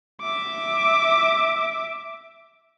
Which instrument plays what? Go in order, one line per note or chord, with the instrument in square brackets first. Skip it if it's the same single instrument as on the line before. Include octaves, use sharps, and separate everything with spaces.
[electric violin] E5 D6